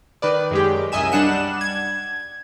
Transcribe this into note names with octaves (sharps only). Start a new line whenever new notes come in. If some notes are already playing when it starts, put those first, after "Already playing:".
D#3 B4 D5
F#2 G#3 G4
C2 F#2 D#5 E5 G#5 E7
G3 D4 F#5 E7
G#6